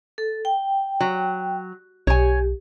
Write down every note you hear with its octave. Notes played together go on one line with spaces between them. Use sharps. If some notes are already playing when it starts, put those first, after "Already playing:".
A4
G5
F#3
B1 G4 C#5 G#5